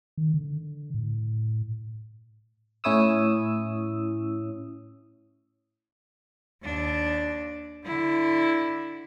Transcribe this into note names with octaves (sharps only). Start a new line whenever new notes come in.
D#3
D3
A2
A2 C#4 E4 C#5 D#6 E6
D#2 D4
D3 E4